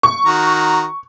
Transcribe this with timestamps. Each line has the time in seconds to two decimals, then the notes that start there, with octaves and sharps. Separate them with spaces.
0.03 C#6
0.26 D#3 F#4 A#5